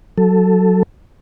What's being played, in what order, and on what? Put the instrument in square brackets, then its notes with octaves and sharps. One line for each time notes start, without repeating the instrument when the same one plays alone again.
[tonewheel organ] F#3 A4